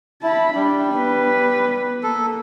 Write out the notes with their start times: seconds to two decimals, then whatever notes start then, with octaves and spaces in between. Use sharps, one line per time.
0.23 E4 A5 B5
0.55 G3 D4
0.95 B3 B4
2.03 A#3 A4